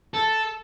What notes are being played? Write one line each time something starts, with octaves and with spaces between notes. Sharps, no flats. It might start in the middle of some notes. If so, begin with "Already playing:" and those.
A4